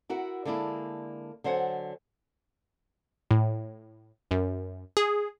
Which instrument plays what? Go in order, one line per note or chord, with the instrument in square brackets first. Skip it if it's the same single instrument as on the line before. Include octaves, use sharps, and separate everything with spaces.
[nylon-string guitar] E4 F#4 A#4 F#5
D3 G#3 A#3 D4 E4
D3 F#3 C5 F#5 G#5
[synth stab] A2
F#2
G#4